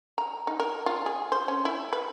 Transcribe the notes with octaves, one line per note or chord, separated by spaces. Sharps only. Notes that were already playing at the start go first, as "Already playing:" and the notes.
A#5
D#4
A#4
F4
G#4
C5
C#4
E4
B4